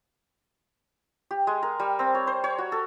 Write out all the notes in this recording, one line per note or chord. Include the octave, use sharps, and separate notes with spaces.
G4
G#3
A#4
G3
C4
C#5
C5
C#5
F#4
A4